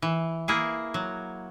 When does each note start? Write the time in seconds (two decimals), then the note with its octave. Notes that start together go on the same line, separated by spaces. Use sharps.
0.02 E3
0.48 A#3 E4 G#4
0.94 F#3